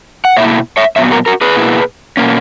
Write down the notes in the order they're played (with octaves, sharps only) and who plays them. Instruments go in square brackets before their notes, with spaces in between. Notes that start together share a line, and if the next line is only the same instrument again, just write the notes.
[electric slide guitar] F#5
B2 A#3 E4 C#5 E5
C#5 E5
A#2 F#3 B3 C#5 E5
F#4 A#4
F#4 A#4
G#4 B4
B2 A#3 E4
B2 A#3 C#4